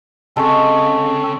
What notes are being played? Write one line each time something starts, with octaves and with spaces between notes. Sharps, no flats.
C#3 G#3 C4 A4 A5 C#6